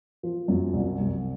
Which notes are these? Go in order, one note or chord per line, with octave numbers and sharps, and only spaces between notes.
F3
F#2
C2
C2